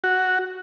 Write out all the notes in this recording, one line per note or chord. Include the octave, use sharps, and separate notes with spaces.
F#4